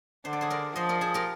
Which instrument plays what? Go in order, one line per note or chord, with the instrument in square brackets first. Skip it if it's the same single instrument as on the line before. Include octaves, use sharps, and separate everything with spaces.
[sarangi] D3 [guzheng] C5
[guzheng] D5
G#4 C5
A#4 D5
[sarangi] F3 [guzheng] C5 D#5
[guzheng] A#4 D5
G#4 C5
G4 A#4